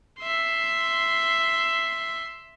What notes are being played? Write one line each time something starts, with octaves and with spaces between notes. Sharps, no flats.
E5 C6